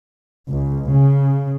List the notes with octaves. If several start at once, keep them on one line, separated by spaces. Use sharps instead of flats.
C#2
C#3